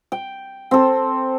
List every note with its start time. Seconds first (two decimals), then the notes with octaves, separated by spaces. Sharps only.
0.12 G5
0.71 C4 A4